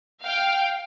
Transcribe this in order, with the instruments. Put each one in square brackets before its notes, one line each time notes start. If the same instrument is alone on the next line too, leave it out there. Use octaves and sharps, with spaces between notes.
[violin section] F5 G5